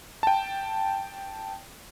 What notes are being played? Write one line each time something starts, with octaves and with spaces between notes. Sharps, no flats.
G5 A5